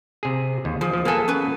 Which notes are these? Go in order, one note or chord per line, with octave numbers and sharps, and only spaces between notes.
C3 G#4
D#2
F3 G#4
F3
A#3 B3 G#4 A4 G#5
C#4 B4